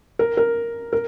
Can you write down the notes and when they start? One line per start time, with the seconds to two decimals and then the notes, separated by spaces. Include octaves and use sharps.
0.19 A#4
0.37 A#4
0.93 A#4